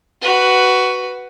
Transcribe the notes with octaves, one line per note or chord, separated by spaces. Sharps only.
F#4 B4